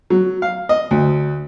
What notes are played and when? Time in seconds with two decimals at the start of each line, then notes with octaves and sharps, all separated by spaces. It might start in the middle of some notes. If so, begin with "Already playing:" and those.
0.10 F#3
0.42 F5
0.69 D#5
0.91 D2